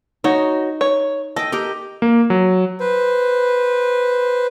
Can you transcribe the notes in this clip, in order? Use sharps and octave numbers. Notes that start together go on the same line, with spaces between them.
D#4 F#4 C#5
C#5
A4 D#5 G5
G4 A#4 D#5
A#3
F#3
B4 C5